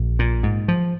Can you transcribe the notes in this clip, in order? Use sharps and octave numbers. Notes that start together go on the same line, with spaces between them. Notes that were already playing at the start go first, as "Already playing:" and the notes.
Already playing: A#1
A#2
G#2
F3